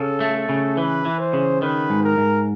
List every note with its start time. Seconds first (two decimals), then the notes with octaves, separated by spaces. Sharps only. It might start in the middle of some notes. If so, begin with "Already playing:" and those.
Already playing: C#3 A4
0.20 A3
0.35 A4
0.49 C#3
0.77 E3 B4
1.05 E3
1.20 C5
1.33 C#3
1.62 D#3 B4
1.90 G#2
2.04 A#4
2.18 G#2